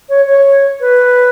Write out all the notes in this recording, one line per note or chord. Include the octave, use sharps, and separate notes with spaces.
C#5
C#5
B4